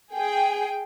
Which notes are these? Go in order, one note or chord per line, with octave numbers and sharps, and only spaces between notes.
G#4 G5